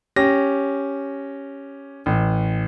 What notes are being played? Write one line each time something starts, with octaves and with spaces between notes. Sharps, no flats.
C#4 G4 A#6
A1